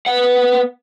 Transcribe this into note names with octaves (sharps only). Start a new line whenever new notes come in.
B3 F#5